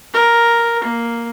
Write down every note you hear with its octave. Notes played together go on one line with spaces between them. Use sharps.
A#4
A#3